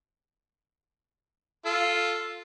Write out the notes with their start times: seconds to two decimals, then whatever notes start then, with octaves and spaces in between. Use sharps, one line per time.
1.65 F4 A4